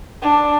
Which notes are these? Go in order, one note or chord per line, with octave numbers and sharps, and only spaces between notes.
D4